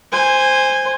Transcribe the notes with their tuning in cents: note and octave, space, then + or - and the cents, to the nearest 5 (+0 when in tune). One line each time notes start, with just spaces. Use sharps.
C5 +0 G#5 -15